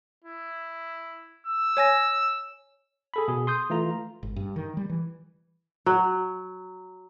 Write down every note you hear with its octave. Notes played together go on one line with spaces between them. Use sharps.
E4
E6
C#5 G#5 A#6
G#4 A4 B5
B2 G#4
C6 D#6 G6
E3 A3 F4 A#5
G#1
G2
D#3
G3
E3
F#3